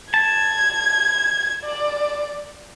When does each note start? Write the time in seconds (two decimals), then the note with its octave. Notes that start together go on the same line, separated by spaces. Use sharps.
0.14 A5 G#6
1.64 D5